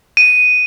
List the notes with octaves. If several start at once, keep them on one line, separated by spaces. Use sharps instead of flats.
D#7